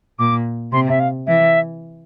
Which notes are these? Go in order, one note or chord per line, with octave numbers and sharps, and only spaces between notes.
A#2 D6
C3 C6
E5
F5
E3 E5